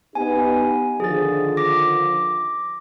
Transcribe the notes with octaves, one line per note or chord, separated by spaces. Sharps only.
B3 D#4 G4 G#5
D3 D#3 F3 G#4 A6
D6 A#6